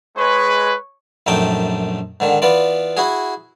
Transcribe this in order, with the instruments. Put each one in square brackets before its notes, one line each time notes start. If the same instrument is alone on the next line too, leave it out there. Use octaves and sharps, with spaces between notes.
[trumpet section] G#3 B4 [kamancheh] C#5
[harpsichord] A#1 F#2 A3 D#4 G5 A5
G#2 D3 D#3
E3 B3 F4 D5
E4 F#4 G#4